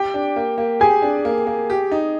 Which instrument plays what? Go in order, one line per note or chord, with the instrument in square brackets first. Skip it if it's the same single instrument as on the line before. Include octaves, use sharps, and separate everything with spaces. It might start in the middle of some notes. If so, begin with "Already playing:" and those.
Already playing: [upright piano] G4 G5
[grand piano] D4
A#3
A#3
[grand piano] G4 [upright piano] G#4 G#5
[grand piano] D4
A#3
A#3
G4
D#4